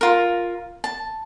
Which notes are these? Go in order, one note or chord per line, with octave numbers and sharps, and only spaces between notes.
F4 A#4
A5